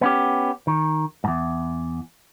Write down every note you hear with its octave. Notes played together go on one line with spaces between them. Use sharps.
B3 C#4 G4
D#3
E2 G#2